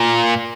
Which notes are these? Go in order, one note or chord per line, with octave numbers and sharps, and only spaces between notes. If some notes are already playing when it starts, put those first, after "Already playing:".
Already playing: A#2